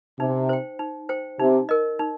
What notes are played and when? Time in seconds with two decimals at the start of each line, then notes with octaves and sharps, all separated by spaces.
0.19 C3 D#4
0.49 C5 G5
0.79 D#4
1.09 C5 G5
1.39 C3 D#4
1.69 A#4 D#5
1.99 D#4